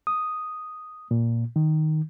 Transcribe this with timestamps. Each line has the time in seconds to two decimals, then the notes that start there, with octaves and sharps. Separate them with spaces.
0.07 D#6
1.11 A#2
1.56 D#3